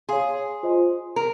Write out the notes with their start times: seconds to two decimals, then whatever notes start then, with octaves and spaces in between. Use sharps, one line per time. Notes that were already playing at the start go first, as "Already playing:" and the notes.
0.09 G#4 C#5 F5 G#5 C6
0.63 F4 C5 D#5 G#5 C6
1.16 A#4 A#5